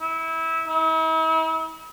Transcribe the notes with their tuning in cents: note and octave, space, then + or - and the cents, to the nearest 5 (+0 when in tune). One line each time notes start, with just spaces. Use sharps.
E4 -20
E4 -45